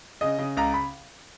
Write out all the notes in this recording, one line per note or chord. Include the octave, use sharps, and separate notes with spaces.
C#3 D#5
C#3
C#2 A#5
B5